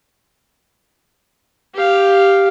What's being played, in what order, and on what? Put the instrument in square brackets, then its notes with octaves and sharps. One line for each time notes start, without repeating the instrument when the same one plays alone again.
[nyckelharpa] G4 F5